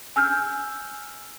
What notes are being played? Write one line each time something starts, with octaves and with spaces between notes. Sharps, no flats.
G#5 E6 F6 G6